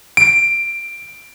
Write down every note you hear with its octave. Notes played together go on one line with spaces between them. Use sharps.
D7